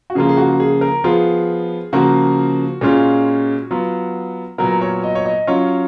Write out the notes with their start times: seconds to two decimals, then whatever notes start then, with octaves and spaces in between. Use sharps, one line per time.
0.10 F#4
0.15 C#3 F3 A#3 F4 G#4
0.29 G#4
0.37 F#4
0.60 G#4
0.81 A#4
1.04 F3 B3 F4 G#4
1.93 C#3 F3 A#3 F4 F#4
2.81 A#2 G#3 C#4 F4
3.71 F#3 B3 F4
4.58 A#2 F#3 B3 A#4
4.81 C#5
5.03 D#5
5.15 C#5
5.26 D#5
5.47 F#3 C#4 F4 C#5